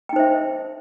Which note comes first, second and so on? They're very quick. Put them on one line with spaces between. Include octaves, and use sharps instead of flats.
G5 D#4 C5 E5